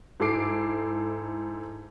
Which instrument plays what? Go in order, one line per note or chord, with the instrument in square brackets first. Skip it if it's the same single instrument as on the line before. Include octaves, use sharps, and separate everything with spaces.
[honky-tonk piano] G#2 E4 A4 D6 C7 D7